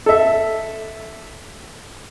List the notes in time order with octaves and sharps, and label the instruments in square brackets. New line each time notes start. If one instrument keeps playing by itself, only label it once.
[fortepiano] A4 E5